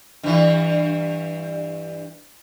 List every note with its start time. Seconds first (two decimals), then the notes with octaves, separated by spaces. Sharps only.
0.23 G2 E3